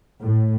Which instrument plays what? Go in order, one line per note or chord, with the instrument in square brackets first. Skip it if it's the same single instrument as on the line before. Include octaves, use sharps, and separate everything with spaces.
[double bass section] A2